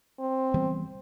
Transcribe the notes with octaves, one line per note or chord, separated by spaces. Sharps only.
C4
E3 G3 B3